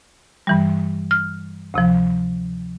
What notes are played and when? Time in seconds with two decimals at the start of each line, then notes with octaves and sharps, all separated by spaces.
0.47 G2 E3 G3
1.11 F6
1.74 D2 C3 F3